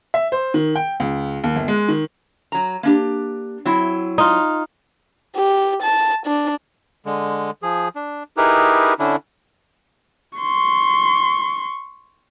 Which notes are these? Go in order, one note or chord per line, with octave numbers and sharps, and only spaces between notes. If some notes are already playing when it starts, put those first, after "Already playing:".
E5
C5
D#3
G5
C#2
D#2
G1
G#3
D#3
F#3 A#5
A#3 D4 G4
F#3 C4 E4
D#4 F4
G4
A5
D4
D3 G#3
F3 G#4
D4
D#4 E4 G4 G#4 A#4 B4
D3 C#4 D4 E4
C6 C#6